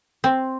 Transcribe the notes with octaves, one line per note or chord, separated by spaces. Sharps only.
C4